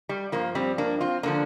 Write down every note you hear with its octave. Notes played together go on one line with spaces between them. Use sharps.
G3
G2 F3 A#3
G3 C4
A#3 D4
C4 F4
D3 F3 A#3 D4